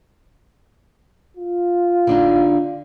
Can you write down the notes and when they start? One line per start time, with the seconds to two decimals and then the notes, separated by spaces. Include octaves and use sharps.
1.37 F4
2.07 D3 D4 D#4